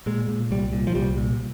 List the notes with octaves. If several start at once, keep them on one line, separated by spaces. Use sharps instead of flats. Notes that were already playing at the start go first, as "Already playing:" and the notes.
A#2 G#3
A#2
C2 G3
A#2
F3
C2 G3
A#2